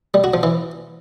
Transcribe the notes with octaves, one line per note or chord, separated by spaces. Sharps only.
G3
F#4
F3
E3